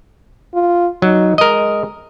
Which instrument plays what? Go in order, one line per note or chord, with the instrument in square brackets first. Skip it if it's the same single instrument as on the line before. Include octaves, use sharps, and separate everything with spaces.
[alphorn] F4
[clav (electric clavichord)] F#3 [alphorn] D#4
[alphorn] G#3 [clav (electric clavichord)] A#4 D#5